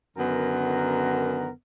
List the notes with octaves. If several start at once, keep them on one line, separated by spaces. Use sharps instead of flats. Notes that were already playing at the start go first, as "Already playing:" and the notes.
F#2 D3 D#3 B3 A#4